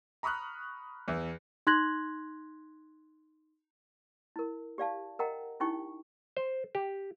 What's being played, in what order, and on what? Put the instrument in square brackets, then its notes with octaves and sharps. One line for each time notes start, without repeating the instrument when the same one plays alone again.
[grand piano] A#5 B5 C#6 D#6 F6 F#6
E2 E3 E5
[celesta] D#4 C6 F#6 G#6 A#6 F#7
[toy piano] E4 A#4
G4 D5 F5 A5
A#4 D#5 F#5 G5 A#5
C#4 D#4 E4 G4 G5 C#6
[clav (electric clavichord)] C5
G4